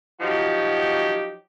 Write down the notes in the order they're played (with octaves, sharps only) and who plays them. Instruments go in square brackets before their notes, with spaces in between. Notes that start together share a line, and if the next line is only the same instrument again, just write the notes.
[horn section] F3 F#3 D#4 F#4 G4